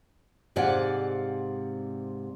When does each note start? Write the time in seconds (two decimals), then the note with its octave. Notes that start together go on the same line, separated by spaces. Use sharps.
0.56 G#2 C3 D5 F5 F#5 G#5